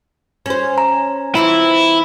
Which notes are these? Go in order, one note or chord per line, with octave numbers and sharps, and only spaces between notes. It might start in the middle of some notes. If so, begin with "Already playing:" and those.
C#4 C5
A#5
E3 C4 E4 F4